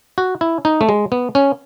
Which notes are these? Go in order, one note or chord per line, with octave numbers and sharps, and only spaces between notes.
F#4
E4
D#4
A3
G#3
B3
C#4